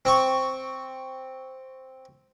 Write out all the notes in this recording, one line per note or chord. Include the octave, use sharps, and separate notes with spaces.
C4 C#6